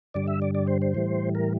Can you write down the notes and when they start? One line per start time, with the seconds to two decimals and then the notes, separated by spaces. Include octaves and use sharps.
0.14 G2 D3 G3 D5
0.28 E5
0.42 D5
0.55 D5
0.67 C5
0.82 C5
0.94 A2 E3 G3
1.35 A#4